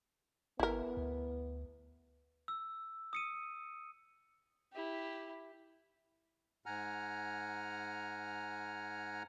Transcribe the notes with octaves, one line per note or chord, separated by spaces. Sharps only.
G#1 B3 E4 A#4
D2
E6
D#6 C#7 D#7
E4 G4
G#2 F#5 G#5 A#5 F6